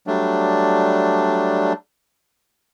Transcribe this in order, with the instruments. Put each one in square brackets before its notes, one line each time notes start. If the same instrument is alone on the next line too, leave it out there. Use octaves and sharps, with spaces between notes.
[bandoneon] F#3 G3 A3 D4